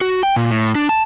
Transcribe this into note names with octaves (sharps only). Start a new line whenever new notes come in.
F#4
G5
A#2
A2
D4
A5